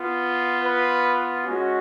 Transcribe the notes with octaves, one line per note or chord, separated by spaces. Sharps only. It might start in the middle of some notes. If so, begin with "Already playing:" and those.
Already playing: B3 F4
B4
G#3 C#4 F#4